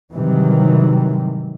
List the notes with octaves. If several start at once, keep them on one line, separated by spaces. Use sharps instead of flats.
G#2 C3 D#3 E3 F#3 G3